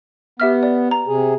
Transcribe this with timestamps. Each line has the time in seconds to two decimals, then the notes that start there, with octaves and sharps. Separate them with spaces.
0.40 B3 G4 E5 F6
0.63 D5
0.91 A#5
1.08 C3 G#4